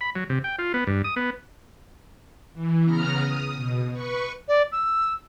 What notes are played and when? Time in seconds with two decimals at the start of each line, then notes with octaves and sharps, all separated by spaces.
0.01 B5
0.15 F#3
0.30 C3
0.44 G5
0.59 F4
0.74 B3
0.87 G2
1.04 D#6
1.16 B3
2.54 E3
2.84 C#3 B3 A#5 F6
3.18 D#6
3.55 B2
3.93 B4 C#6
4.48 D5
4.72 E6